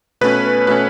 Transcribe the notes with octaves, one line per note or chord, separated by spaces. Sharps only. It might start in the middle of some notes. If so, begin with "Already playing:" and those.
B2 A3 C#4 B4
B2 A3 C#4 B4